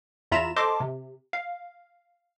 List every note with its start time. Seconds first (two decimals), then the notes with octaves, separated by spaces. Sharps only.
0.32 E2 F4 E5 A#5 B5 E7
0.56 A4 C5 D#5 A5 C6 D6
0.80 C3
1.33 F5